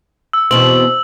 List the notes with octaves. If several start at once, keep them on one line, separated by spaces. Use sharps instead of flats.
E6
E2 B2 C4 F#7